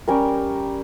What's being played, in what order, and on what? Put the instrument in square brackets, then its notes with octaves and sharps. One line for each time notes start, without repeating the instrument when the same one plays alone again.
[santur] G3 C#4 G4 A#4